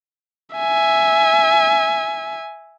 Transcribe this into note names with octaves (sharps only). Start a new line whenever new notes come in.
E5 G#5